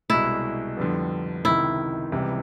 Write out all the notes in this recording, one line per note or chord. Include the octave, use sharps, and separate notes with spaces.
C2 B2 G#3 E4
F2 D3 G3 B3
C#2 C3 D#3 E4
C#2 C3 E3 G3